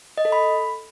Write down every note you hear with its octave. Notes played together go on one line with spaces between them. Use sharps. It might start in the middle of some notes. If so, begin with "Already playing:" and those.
D#5
A4
B5